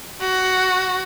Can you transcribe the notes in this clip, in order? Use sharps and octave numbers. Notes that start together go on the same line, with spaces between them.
F#4